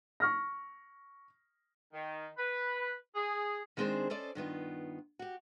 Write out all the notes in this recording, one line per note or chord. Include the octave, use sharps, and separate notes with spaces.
C#6 F6 A#6
D#3
B4
G#4
D#3 G#3 C4 D4 G#4 C5
C#4 A4 C5 D5 D#5
G2 D#3 B3 F4
F#4 G4